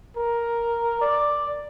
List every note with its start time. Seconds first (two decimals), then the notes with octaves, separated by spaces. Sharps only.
0.16 A#4
1.01 D5